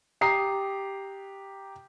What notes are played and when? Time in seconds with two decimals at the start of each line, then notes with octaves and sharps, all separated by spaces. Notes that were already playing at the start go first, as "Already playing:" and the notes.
0.21 G4 A#5 D#6 C7